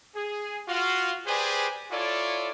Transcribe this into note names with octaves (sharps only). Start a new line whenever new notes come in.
G#4
F4 F#4 F5
G4 G#4 B4 C5 D5 G#5
E4 F4 A4 C#5 D5